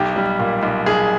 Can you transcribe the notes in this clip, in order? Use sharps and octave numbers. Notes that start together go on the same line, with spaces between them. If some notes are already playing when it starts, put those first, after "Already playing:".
Already playing: B1 G4
G3
A#2
B1
B1 G#4